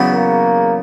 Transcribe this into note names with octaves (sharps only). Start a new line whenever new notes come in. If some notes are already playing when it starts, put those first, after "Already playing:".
Already playing: E2 C#3 F#3 B3
A#3